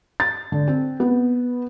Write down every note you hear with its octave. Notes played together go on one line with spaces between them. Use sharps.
A6
D3
C4
B3